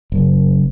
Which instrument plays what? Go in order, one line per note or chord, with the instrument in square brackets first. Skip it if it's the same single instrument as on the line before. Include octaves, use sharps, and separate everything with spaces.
[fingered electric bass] F#1